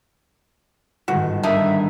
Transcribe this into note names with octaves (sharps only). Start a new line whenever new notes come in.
G1 G#2 D#3 F#4
G2 A#3 E5 A5 D#6